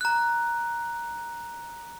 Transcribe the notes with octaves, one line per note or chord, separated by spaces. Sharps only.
A#5 F#6